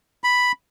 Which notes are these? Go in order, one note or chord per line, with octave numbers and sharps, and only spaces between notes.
B5